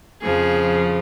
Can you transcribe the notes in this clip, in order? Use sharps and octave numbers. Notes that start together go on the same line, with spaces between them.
F2 C#3 F3 G#4